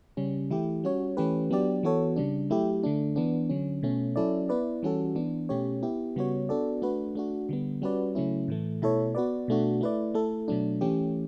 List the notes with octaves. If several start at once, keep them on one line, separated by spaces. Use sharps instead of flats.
C#3 G3 C#4
E3 A3 E4 G4
G3 C#4 F#4 C#5
E3 A3 C#4 G4 B4
F#3 B3 D4 G4 D5
E3 B3 F#4 A4 C#5
C#3 G3 D4
F#3 A3 E4 G4
D3 A3 D4
E3 B3 D4
D3 F#3 C#4
B2 A3 C#4
F#3 C#4 E4 A4 D5
B3 E4 B4 D5
E3 G3 C#4 F#4 A4
E3 B3 D4
B2 A3 C#4 G4 C#5
B3 E4 G4
C#3 G3 B3 F#4 C#5
B3 D4 F#4 A4 D5
A3 D4 F#4 B4
A3 D4 F#4
D3 G3 B3
G3 C#4 F#4 B4 D5
C#3 F#3 A3 C#4 E4
A2 E3 A3
B2 A3 E4 A4 C#5
B3 F#4 B4 D5
B2 A3 D4 F#4
A3 E4 B4 D5
A3 E4 A4
B2 F#3 A3 D4
E3 A3 C#4 G4